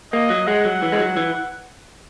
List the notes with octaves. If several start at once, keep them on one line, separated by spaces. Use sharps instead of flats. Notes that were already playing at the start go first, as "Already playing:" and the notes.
A#3 D#5
F#3
G#3 F#5
F#3
E3
G#3
F#3
E3